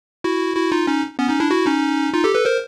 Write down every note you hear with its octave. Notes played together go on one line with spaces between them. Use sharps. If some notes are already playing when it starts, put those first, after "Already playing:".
E4 F#4
E4 F#4
D#4 F4
C#4 D#4
B3 C#4
C#4 D#4
D4 E4
E4 F#4
C#4 D#4
D#4 F4
G4 A4
A4 B4
A#4 C5